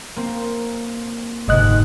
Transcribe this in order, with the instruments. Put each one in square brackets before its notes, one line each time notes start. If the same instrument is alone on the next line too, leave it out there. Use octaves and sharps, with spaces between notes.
[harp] A#3 C4
[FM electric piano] G1 D#5 F#6 [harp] G#2 C3 G#3